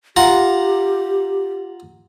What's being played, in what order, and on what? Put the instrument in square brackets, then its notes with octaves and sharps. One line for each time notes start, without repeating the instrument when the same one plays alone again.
[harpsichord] F4 F#5 A#5 [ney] G4